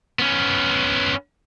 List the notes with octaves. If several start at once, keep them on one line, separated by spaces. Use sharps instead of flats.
B3 C#4